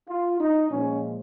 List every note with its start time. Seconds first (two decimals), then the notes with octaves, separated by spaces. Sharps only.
0.09 F4
0.39 D#4
0.71 A#2 F3 G#3 C#4